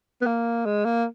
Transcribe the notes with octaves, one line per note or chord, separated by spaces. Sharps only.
B3
A#3
G#3
A#3